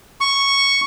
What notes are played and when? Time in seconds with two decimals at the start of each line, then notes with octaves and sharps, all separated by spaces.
0.21 C#6